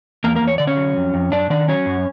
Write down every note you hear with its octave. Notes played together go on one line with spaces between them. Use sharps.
E2 A#3 A#4
A#3 A#4
E2
C#5
D3 D5
C#4 C#5
F#3
F2
F2
F#2 D4 D5
D#3 D4 D5
F#3 C#4 C#5
F#2